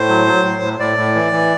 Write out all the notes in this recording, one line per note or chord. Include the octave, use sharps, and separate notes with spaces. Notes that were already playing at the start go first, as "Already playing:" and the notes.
Already playing: A2 C5
F#3
F#3
A2
A2
A2 D5
A2
E3
E3